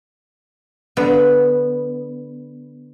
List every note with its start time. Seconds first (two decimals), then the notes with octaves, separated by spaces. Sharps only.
0.97 D3 B3